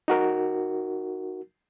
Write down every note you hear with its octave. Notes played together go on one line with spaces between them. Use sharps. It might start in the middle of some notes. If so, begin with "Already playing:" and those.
D#4 F#4 A#4